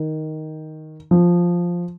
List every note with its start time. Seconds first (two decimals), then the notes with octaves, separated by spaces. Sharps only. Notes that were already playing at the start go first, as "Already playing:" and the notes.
Already playing: D#3
1.11 F3